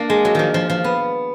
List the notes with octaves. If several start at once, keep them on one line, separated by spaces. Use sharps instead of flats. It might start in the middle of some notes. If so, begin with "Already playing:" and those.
Already playing: A#3 D4
G#3
F#3
D#3 F3
F3
F3
B3